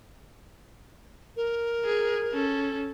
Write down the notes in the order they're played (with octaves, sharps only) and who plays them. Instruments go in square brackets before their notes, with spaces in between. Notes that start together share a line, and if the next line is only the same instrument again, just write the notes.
[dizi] A#4
[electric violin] G#4
C#4 A4